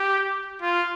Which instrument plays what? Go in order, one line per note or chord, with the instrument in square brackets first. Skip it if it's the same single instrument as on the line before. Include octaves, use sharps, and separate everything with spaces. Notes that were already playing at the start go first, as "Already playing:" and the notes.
Already playing: [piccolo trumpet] G4
F4